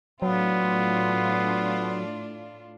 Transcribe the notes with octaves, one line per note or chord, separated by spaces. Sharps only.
A2 F#3 B3 D4 F4